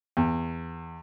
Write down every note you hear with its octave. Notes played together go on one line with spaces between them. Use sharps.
E2